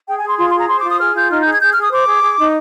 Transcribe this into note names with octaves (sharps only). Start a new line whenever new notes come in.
G#4 G5
G#5
G#4 C6
F4 C6
C6
G#4 A#5
C5 C6
D6
F4
D#6
G#4 F6
F4 G6
D#4 F6
G6
G#4
G#6
G#4 G6
F6
G#4 D#6
C5 D6
G#4
G#4
D#4